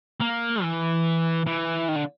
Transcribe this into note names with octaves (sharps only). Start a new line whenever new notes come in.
A#3
E3
E3
D#3
D3